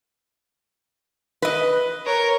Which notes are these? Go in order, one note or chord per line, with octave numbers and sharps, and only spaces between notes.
B4 D#5
A#4 C#5